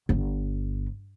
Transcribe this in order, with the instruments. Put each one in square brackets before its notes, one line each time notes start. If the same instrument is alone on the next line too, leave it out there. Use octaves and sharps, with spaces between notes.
[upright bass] G1